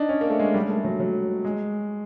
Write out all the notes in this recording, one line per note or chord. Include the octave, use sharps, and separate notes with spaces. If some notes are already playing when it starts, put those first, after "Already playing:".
Already playing: D4 D#4
C#4
A#3
A3
G#3
G3
A3
F#3
F#3
G#3